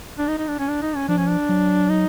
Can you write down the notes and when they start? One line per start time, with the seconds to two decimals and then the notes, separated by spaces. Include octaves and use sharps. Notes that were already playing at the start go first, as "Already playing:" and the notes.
0.18 D4
0.28 D#4
0.38 D#4
0.48 D4
0.59 C#4
0.68 D4
0.82 D#4
0.96 C#4
1.09 F3 D4
1.18 C#4
1.28 D4
1.49 F#3
1.89 D#4